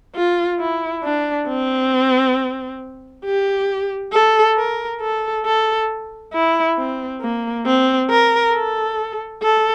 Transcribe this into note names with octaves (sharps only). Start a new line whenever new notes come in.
F4
E4
D4
C4
G4
A4
A#4
A4
A4
E4
C4
A#3
C4
A#4
A4
A4